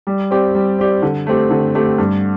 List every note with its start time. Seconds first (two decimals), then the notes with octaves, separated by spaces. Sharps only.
0.07 G3
0.31 C4 G4 D5
0.55 G3
0.79 C4 G4 D5
1.02 D3
1.27 A3 C4 G4
1.50 D3
1.75 A3 C4 G4
1.98 G2